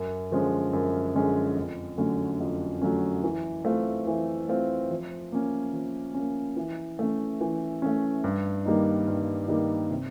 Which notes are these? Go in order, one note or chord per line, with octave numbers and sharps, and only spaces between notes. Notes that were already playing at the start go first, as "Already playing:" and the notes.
Already playing: F#2
D3 F3 G#3 C#4
F#2
D3 F3 G#3 C#4
F2
D3 F#3 A3 C#4
F2
D3 F#3 A3 C#4
E3
A3 C4 F4
E3
A3 C4 F4
F3
A#3 C#4
F3
A#3 C#4
E3
A3 C#4
E3
A3 C#4
G2
D#3 G3 A#3 D#4
G2
D#3 G3 A#3 D#4
C3